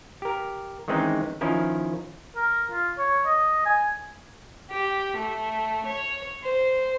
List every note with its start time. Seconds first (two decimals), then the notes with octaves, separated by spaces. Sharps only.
0.22 G4 A#4
0.88 D#3 E3 G#3 C4 C#4 D#4
1.41 D#3 F3 C#4 E4 A#4
2.36 A#4
2.70 F4
2.98 C#5
3.25 D#5
3.65 G#5
4.71 G4
5.17 A3
5.86 C#5
6.44 C5